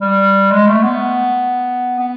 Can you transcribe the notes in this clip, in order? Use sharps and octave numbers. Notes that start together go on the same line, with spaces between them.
G3
G#3
A3
B3
B3